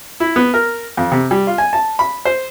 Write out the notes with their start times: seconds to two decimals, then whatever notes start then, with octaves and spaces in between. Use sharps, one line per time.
0.20 E4
0.36 B3
0.54 A#4
0.97 F2
1.12 C3
1.31 G3
1.47 F4
1.58 G#5
1.73 A5
1.99 B5
2.25 C5